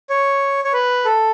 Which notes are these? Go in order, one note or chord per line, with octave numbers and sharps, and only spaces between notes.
C#5
C#5
B4
A4